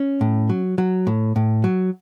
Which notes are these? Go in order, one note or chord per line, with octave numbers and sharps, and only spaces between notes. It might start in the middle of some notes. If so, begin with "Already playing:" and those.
Already playing: C#4
A2
F#3
F#3
A2
A2
F#3